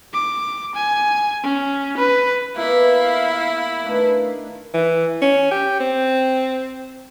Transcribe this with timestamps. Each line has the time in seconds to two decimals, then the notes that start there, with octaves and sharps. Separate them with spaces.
0.13 D6
0.75 G#5
1.44 C#4
1.97 B4
2.56 B2 A#3 E4 E5 F5
3.84 D#3 A3 D4 B4 F5
4.74 E3
5.22 C#4
5.51 G4
5.80 C4